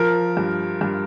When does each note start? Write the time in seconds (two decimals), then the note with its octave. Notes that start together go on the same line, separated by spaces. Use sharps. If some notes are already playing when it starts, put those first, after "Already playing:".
Already playing: F3 A#4
0.37 G2
0.81 G2